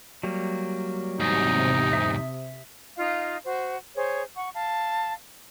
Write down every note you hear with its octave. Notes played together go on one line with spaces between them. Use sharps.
F#3 G3 A#3
E2 G#2 C3 D#4
E5 D#6
D#4 F4 D#5 F5
F#4 C5
G#4 C5 C#5
F#5 C#6
F5 A5